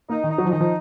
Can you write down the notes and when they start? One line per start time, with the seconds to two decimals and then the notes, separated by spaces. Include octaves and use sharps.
0.09 A#3 D#4
0.24 D#3
0.31 D#4
0.38 F#3
0.45 F3
0.52 D#3 D#4
0.61 F3